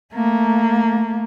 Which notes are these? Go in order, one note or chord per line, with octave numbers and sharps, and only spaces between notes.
A3 A#3